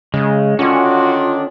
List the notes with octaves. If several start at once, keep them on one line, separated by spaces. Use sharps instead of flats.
C#3 G#3
D3 D#3 C#4 D4 F4 F#4